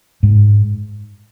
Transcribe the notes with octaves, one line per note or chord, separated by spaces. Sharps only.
G#2